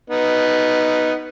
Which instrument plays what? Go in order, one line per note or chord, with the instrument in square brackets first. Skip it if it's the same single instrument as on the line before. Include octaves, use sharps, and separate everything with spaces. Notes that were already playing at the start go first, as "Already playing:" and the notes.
[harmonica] B3 D#4